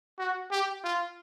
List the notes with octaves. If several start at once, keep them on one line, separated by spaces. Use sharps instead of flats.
F#4
G4
F4